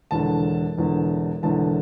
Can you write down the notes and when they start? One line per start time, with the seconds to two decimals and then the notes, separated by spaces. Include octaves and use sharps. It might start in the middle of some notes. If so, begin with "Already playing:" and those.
0.11 E1 E2 D3 A5
0.77 E1 E2 D3
1.43 E1 E2 D3 A5